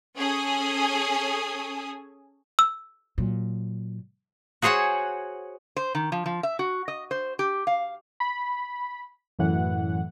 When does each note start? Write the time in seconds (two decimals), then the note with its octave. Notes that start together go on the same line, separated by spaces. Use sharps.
0.18 C#4 G#4 A4 G#5 D#6
2.59 E6
3.18 A#2 F#3
4.62 F#4 G#4 C5 C#5 F#5
5.76 C5
5.95 D#3
6.12 F3
6.26 F3
6.43 E5
6.59 F#4
6.88 D#5
7.11 C5
7.39 G4
7.67 F5
8.20 B5
9.39 F#2 A2 E3 F#5